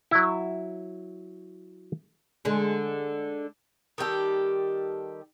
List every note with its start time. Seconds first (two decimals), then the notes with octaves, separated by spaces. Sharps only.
0.11 F#3 E4
2.45 D3 G#3
3.98 D#3 G3 G4 A4